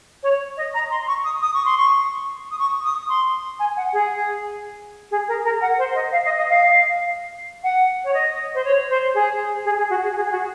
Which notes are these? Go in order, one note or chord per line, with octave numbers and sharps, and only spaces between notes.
C#5
D#5
A#5
C6
C#6
D#6
D#6
C#6
C6
C#6
D#6
C#6
D#6
C6
G#5
F#5
G#4
G#4
A#4
A#4
F#5
C5
D#5
F5
D#5
D#5
F5
F#5
C#5
D#5
C5
C#5
C5
G#4
G#4
G#4
F#4
G#4
G#4
G#4
F#4